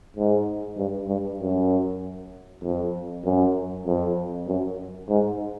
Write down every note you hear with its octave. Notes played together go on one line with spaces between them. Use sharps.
G#2
G2
G2
F#2
F2
F#2
F2
F#2
G#2